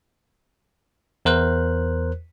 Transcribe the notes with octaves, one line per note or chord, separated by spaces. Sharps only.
E2 A#4 C5 F#6